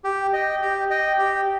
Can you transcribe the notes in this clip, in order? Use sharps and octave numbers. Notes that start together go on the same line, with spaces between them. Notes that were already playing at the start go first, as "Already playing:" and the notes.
G4
D#5 G5
G4
D#5 G5
G4